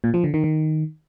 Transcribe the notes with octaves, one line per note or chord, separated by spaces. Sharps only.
A#2
F3
D3
D#3
D#3